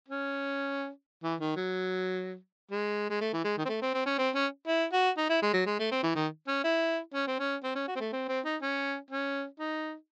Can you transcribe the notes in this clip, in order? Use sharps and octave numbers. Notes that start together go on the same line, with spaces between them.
C#4
E3
D#3
F#3
G#3
G#3
A3
E3
G#3
D#3
C4
A3
C4
C4
C#4
C4
C#4
E4
F#4
D#4
E4
G#3
F#3
G#3
A3
C4
E3
D#3
C#4
E4
C#4
C4
C#4
C4
C#4
F#4
C4
A3
C4
C4
D#4
C#4
C#4
D#4